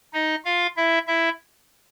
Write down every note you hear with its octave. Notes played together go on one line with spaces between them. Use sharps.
D#4 D#5
F4 F5
E4 E5
E4 E5